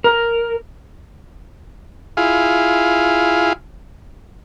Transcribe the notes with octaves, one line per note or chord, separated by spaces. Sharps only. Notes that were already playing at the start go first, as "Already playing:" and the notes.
A#4
E4 F4 G#4 F5